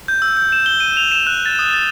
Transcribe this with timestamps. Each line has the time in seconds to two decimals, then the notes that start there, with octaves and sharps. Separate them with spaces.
0.08 G6
0.22 E6
0.37 G6
0.52 E7
0.66 G7
0.80 D#7
0.97 F7
1.12 E7
1.27 F#6
1.46 A6
1.59 D#6
1.74 A6